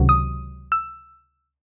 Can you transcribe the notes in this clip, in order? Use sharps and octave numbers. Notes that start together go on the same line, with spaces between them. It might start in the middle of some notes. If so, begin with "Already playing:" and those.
Already playing: C#2 C3 D#3 F#3
D#6
E6